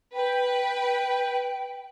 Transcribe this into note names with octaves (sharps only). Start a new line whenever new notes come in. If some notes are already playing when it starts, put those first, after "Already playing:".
B4 G5